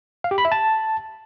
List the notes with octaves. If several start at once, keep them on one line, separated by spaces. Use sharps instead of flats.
F5
G4
B5
E5
A5